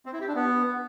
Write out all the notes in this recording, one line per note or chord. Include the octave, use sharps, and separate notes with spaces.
C4
E4
G4
D4
B3